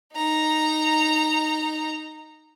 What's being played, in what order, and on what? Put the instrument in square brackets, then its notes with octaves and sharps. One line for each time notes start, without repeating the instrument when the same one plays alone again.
[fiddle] D#4 A#5